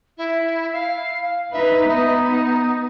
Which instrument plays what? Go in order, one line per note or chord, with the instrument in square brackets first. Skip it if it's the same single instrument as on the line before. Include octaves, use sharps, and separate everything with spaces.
[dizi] E4
F5
[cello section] D#4 B4 [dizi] E5
[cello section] B3 [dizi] D#4